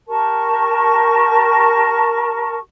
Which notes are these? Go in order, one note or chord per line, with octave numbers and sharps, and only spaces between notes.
G4 A#4 A5 C#6